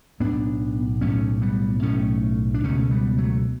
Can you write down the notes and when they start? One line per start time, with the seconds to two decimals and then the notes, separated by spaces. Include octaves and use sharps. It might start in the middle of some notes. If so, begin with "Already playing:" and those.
0.20 B1 A2 B3 D4
1.01 B1 A2 A3 C#4
1.42 G3 B3
1.82 B1 A2 A3 C#4
2.54 D4
2.64 C#2 B2 A3 C#4
2.91 G3 B3
3.18 F#3 A3